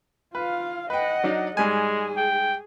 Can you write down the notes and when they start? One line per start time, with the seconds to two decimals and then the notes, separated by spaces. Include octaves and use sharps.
0.35 F4 B4 F5
0.90 B4 D#5 F#5 G5
1.24 F#3 D4 D#4
1.57 G#2 G3 G#3 G#4 G#5
2.17 G5